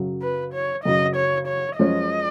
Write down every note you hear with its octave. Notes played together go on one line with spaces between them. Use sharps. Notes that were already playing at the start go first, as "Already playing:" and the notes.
Already playing: F#2 C#3 F#3
B4
C#5
F#2 C#3 F#3 D#5
C#5
C#5
F#2 F3 G#3 C#4 F4 D#5